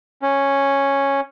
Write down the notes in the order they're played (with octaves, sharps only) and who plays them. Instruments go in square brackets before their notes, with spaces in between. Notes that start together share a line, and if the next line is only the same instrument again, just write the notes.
[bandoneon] C#4